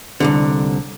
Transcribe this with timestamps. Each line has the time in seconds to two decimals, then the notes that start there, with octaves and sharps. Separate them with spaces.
0.20 C2 G#2 D3